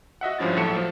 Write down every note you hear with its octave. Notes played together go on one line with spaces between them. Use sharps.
F#4 D#5 E5 F#5
G#1 G2 F3 C#4 E4 A6
A#1 A2 F#3 A4 C#7 E7
F3 A3